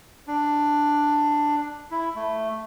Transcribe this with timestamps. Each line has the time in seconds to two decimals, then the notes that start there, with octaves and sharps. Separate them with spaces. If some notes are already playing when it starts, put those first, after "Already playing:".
0.28 D4
1.91 E4
2.15 A3